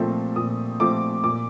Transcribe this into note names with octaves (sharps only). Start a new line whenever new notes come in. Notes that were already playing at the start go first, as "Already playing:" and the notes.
Already playing: A#2 F3 A3 C4
A#2 D#6
F3 A3 C4 D6
A#2 D6